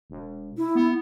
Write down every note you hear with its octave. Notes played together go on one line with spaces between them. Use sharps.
E1
E4
B3